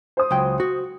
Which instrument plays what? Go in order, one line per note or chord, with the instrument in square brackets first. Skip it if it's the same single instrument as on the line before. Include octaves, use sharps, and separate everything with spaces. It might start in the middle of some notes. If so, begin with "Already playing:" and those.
[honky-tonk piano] C5 D#6
[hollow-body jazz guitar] C#2 F#3 G5
F#4